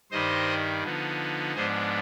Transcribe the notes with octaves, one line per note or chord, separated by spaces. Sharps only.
G2 D#3 G3 C5 D#5
D3 F3 B3 D#4
G#2 F3 B3 D4 G#4 C5